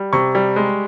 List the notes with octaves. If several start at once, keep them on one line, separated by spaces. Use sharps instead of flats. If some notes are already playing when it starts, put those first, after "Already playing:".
Already playing: G3
C3 C#6
G3
G#3